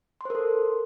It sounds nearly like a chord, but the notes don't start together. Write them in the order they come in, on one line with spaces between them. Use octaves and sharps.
C6 C5 A#4 A4